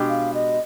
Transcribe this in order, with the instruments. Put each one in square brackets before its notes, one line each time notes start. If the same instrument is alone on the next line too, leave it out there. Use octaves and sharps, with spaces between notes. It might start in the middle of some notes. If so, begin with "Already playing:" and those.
Already playing: [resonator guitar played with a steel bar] B2 G#3 D4 G4
[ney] F5
D#5